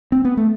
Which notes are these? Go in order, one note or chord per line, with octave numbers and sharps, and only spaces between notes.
C4
B3
A3